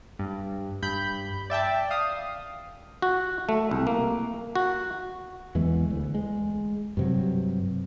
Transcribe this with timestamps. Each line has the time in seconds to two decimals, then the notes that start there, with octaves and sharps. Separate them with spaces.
0.19 G2
0.82 G2 B5 G6
1.50 D5 E5 G5 A5
1.90 F5 D#6
3.02 F#4
3.49 A3
3.71 C2
3.87 A#3
4.56 F#4
5.55 E2 E3 G#3 B3
5.90 D2
6.14 G#3
6.97 G2 C3 F#3